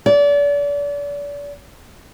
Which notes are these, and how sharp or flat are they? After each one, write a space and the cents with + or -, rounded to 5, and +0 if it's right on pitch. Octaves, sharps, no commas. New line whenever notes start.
D5 -35